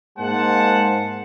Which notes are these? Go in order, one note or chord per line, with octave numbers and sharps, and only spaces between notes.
G#2 G#3 A#3 C5 F#5 A5